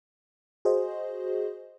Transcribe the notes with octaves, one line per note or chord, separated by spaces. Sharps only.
F#4 G#4 C5 D#5